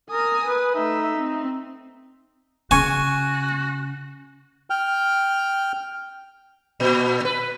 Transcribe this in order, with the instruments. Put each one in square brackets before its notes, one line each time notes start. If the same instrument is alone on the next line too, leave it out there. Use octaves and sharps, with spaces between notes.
[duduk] A#4 [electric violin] G#5 D#6
[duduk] B4
[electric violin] A3 E5 [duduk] D#4
[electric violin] C4
[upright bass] C#3 [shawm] F#4 [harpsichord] G#5 [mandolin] C#6 F6
[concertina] G5 F6
[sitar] A#2
B4